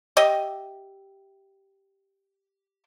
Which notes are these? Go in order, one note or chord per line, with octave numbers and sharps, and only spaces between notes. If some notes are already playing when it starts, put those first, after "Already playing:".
G4 D#5 E5